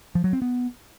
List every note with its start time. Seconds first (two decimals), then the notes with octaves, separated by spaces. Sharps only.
0.15 F3
0.24 F#3
0.33 C4
0.42 B3